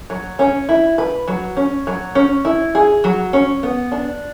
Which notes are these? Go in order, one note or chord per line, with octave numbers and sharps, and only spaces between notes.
F#3
C#4
E4
B4
F#3
C#4
F#3
C#4
E4
G#4
F#3
C#4
B3
D4